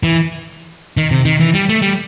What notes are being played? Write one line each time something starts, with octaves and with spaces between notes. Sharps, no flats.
E3
D#3
C3
D#3
E3
G3
A3
G3